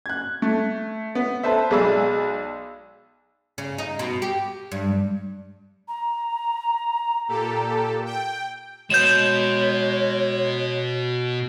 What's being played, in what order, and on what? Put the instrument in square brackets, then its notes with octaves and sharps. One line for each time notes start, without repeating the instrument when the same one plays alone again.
[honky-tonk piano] F#6 G#6
A3
B3
A4 B4 C5 E5
B1 G#3 G#4 D5 B5 E6
[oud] C#3
D#4
B2
G4
G2
[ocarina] A#5
[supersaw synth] A#2 G4 A4
G5
[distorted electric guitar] B2 [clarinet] G#3 [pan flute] C#5 [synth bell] G6 E7